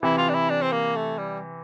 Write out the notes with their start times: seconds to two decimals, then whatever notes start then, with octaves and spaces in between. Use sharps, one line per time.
0.03 C3 E3 E4
0.18 F4
0.29 D4
0.34 E4
0.50 D4
0.62 C4
0.72 A#3
0.96 A3
1.18 G3